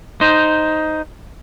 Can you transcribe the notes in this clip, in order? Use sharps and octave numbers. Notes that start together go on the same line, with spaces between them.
D#4 C5